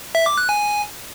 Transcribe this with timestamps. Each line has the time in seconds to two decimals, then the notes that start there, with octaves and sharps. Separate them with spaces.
0.15 E5
0.26 D6
0.38 F#6
0.49 G#5